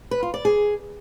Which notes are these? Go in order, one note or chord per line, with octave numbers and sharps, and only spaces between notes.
B4
F4
D5
G#4